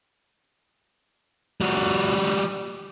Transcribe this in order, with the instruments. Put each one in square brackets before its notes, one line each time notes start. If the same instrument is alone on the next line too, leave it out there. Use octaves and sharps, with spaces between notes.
[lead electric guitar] G3 F#4